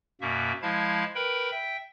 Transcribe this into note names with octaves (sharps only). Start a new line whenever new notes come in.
F#2 B2 A#3 E5
F3 G#3 E4 F5 A5 G#6
A#4 B4 G5 B5
E5 G5